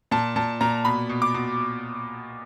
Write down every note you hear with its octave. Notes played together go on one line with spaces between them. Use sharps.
A#2 A5
A#2 A5
A#2 A#5
B2 B5
B2
D6
B2